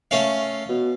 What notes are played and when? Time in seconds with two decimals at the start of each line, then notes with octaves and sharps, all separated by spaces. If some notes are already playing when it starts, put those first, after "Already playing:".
0.11 A3 C#4 F5
0.69 B2